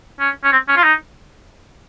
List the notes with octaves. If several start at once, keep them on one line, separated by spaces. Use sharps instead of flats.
C#4
C#4
C4
C#4
F4
D#4